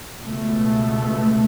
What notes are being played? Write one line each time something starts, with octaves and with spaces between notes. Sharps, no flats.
C#2 B2 A3